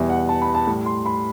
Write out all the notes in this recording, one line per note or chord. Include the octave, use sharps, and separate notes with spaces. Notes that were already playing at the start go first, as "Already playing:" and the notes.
Already playing: E2 B2 G3 E5
F#5
A5
B5
A5
A2 G3
C6
B5